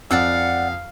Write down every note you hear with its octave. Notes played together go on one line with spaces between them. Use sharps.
F2 D5 F5 F#5 E6